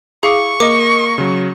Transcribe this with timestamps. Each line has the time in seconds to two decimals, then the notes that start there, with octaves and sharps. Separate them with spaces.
0.23 E4 G#4 F5 C#6 D6
0.60 A#3 A#4 D#5 D6
1.18 C#3 F#3